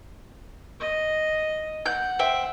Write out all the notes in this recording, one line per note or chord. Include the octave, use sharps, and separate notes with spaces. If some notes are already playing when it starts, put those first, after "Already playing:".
D#5
F#5 G6
C5 E5 G5